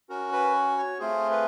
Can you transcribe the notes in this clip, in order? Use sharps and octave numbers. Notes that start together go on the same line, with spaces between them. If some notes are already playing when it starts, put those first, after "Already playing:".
C#4 F#4 A#4
B4
C#5
A3 C4 F4 G#4 C5
B4